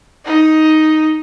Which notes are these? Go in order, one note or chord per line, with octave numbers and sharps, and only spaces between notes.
D#4